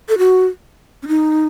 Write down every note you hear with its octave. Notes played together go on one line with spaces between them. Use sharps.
A4
F#4
C#4
D#4